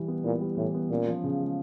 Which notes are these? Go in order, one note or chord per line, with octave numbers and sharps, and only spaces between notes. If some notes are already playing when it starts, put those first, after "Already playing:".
Already playing: E3 G3 E4
B3
A#2 E4
G3
A2 E3
B3
A#2 C#4
F3
C#3
G#3